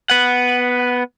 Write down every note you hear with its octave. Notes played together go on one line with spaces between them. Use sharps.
B3 F#5